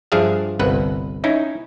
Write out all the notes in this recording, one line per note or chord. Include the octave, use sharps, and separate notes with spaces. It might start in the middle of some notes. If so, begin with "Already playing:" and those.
G2 F3 D4 G#4 E5 F5
G1 C2 B4 F#5
C#4 D#4 E4